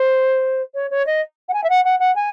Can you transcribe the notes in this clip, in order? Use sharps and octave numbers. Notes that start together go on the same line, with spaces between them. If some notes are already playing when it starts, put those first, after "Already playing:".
Already playing: C5
C#5
C#5
D#5
F#5
G#5
E5
F#5
F#5
F#5
G#5